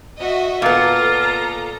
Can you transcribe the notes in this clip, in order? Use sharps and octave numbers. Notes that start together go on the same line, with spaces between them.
F#4 D#5 E5
A#2 B3 F4 A4 A#5